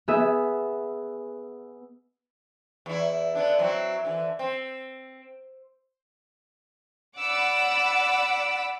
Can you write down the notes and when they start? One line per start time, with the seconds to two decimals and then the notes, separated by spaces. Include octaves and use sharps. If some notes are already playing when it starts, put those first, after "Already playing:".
0.08 B3 G#4 E5
2.86 E2 E4
3.35 D3 B3 D4
3.59 F#3 C4 E4
4.05 D3 E3
4.39 C4
7.19 D5 F#5 B5 D6 E6